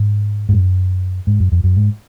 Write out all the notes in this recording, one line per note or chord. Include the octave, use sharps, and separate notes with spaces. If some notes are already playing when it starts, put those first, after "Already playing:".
Already playing: G#2
G#2
F#2
G#2
F#2
F2
F#2
G#2